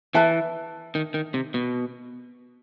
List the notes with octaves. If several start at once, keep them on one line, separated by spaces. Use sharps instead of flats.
E3 B4 E5 A5
D#3
D#3
C3
B2